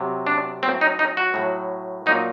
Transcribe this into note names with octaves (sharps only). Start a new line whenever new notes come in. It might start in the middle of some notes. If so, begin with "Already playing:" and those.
Already playing: C3 F#3
D4
A2 F#3 C4
D#4
D#4
F#4
A2 F#3
A#2 F#3 D#4